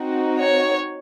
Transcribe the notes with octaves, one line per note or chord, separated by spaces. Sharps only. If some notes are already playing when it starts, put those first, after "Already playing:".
Already playing: C4 D#4 F#4
C#5